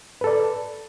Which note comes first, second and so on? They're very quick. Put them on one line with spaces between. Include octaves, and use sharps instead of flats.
B4 A4 D5